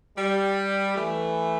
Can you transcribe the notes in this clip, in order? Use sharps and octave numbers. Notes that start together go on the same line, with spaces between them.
G3
E3 A3